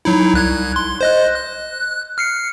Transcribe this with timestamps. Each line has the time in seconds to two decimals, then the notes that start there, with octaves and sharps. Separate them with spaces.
0.05 F#3 D#4 E4
0.34 C2 F#6 G#6
0.76 C6
1.01 C5 D#5 F#6
1.36 F#6
2.18 F6 C7 C#7